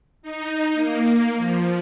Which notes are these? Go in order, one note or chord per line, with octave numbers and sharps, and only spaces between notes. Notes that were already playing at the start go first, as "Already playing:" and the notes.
D#4
A#3
F3